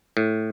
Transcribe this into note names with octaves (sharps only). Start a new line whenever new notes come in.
A2